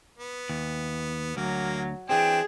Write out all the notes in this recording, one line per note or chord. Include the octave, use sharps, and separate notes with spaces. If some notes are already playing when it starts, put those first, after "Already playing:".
B3
D#2
D2 F#3 A#3
E3 C4 D4 G#4 G5